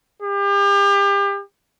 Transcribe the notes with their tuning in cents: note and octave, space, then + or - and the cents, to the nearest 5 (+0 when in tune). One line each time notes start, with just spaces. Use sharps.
G4 +35